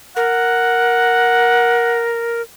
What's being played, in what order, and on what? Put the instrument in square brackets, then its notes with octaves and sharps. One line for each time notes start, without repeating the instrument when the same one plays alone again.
[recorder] A#4 [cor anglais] F#5